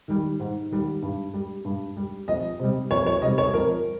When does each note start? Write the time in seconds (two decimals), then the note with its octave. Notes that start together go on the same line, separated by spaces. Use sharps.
0.08 D#3 G3
0.40 G#2
0.71 D#3 G3
1.02 G2
1.34 G3
1.65 G2
1.96 G3
2.28 F2 D#5
2.60 C3 G3
2.91 F2 C#5
3.06 C#5
3.22 C3 G3 D#5
3.38 C#5
3.54 F2 A#4